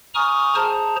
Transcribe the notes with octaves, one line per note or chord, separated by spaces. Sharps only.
G#5 A#5 C#6 D#6 F6
G#4 C5 A5 A#5